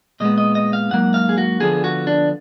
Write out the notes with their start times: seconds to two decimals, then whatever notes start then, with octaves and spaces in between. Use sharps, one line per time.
0.20 A#2 G#3 B3 D#5
0.38 D#5
0.55 D#5
0.73 F5
0.91 G#2 F#3 A#3 F#5
1.14 F5
1.29 G#4
1.38 F#4
1.60 D3 F3 B3 G#4
1.84 F#4
2.07 D4